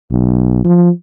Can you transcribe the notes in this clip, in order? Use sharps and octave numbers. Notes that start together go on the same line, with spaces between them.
B1
F3